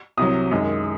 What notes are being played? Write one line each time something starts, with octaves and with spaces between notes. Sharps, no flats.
C2 C3 F#3 D#6
F#2 D#3 G#3